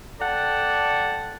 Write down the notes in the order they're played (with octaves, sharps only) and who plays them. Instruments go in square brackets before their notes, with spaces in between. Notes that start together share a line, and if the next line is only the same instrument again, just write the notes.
[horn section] A4 D5 F#5 G5 A5